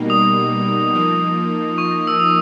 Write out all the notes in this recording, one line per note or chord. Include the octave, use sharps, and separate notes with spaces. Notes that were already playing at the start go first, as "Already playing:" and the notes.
Already playing: B2 G3 A#3 D#4
D#6
F3 A#3 D#4
C#6
E6
D#6